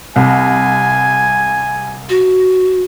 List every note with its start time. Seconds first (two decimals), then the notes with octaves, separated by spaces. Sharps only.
0.16 C2 G#5
2.09 F#4